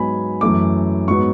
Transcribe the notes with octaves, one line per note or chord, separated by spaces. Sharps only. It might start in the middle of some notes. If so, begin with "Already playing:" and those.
Already playing: G#2 F#3 B3 G#5 B5
F#2 E3 A3 D6
G#2 F#3 B3 C#6